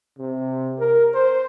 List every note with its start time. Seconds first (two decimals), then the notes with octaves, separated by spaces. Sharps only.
0.19 C3
0.79 A#4
1.14 C5